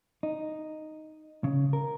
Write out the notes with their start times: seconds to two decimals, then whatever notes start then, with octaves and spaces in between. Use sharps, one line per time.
0.23 D#4
1.44 C#3
1.73 A#4